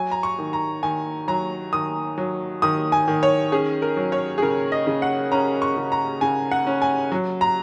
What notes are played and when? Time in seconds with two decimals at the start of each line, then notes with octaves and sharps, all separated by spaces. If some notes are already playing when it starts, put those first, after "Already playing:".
Already playing: F#3 G#5
0.11 A#5
0.23 C#6
0.38 D#3
0.53 A#5
0.83 D#3 G#5
1.28 F#3 A#5
1.73 D#3 D#6
2.18 F#3
2.62 D#3 D#6
2.92 G#5
3.08 D#3
3.23 C#5
3.52 C#4 G#4
3.82 A#4
3.97 F#3
4.12 C#5
4.38 G#4
4.42 C#3 A#4
4.72 D#5
4.87 C#3
5.02 F#5
5.32 C#4 A#5
5.62 C#6
5.77 C#3
5.92 A#5
6.21 C#3 G#5
6.51 F#5
6.67 C#4
6.82 G#5
7.12 F#3
7.41 A#5